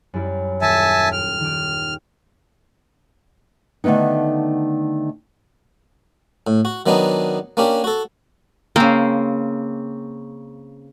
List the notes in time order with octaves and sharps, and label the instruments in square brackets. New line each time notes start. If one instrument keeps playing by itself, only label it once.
[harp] F#2 G3 E4
[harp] D#1 B6 C#7 [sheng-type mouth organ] E5 G#5 A5
[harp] G5 [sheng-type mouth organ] F6
[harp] D#3 G4
[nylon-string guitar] D3 D#3 A3 B3 D#4
[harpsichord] A2
F#4
D#3 F#3 B3 D4 D#4
A#3 C#4 D4 G4
F#4 A4
[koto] C#3 C4 [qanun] A#3